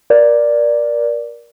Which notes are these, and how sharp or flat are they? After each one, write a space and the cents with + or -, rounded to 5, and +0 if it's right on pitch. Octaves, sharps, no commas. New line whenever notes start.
A#4 +25 D5 +0